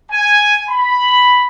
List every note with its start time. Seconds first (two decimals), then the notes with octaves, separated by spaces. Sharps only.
0.11 G#5
0.69 B5